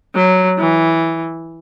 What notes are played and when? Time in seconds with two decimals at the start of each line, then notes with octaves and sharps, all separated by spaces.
0.15 F#3
0.58 E3